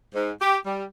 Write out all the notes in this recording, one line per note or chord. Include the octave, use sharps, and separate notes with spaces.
G#2
G4
G3